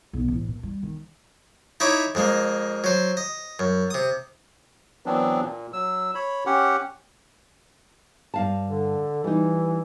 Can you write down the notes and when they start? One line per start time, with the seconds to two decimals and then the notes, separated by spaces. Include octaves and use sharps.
0.13 B1
0.28 A1
0.48 A#2
0.63 G3
0.83 D#3
1.80 D#4 E4 C#5 B5 D6
2.15 F2 G#3 A#3
2.84 F#3 C5
3.17 D#5
3.59 F#2
3.90 C3 D#6
5.06 E3 F#3 B3 C4 D4
5.43 A#2
5.73 F#3 E6
6.15 C#5 B5
6.46 C#4 G4 F#5
8.34 G2 F5 A5
8.68 D3
9.24 E3 G3 D#4